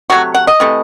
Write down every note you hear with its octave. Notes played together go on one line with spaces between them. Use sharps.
C3 F#3 A3 F#4
F#5
D#5
C3 E3 A3